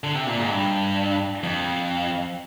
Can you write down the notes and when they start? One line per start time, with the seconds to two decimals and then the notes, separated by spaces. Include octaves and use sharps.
0.04 D3
0.15 C3
0.27 A#2
0.38 G#2
0.50 G2
1.43 F2